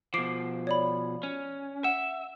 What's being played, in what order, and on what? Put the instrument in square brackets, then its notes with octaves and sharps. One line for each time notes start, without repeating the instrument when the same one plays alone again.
[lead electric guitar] B2 F3 [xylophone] D6 C7 D7
[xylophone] C#5 D5 B5
[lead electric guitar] C#4
[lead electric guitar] E5 [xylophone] F#5